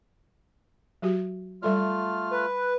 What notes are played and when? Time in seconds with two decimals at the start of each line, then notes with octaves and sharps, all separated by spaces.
1.02 F#3 F#4 G4
1.62 G3 A3 F4 A4 D5 F6
2.31 B4